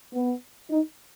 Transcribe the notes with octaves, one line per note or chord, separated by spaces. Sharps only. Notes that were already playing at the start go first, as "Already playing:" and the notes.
B3
D#4